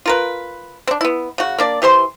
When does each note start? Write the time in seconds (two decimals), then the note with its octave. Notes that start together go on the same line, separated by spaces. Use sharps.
0.06 F4 A#4 B4
0.87 C4 D4
1.01 B3 E4
1.38 C#3 F#4
1.58 A#3 D4 D5
1.82 E3 G4 C5 C6